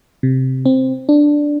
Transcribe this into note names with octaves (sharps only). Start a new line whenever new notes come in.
C3
C4
D4